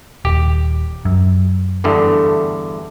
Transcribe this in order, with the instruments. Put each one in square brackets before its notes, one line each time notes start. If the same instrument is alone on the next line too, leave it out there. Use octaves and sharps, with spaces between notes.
[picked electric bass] D#1 [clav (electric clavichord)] G4
[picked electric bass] F#2
[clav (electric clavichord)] E2 G2 D3 [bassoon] A3